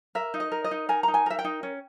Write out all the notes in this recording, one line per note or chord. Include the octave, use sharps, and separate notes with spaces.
A#4 E5
D#4
D#5
A#4
D#5
D#4
A#4 G#5
D#4 A#5
G#5
A#4 E5
G5
D#4
C#4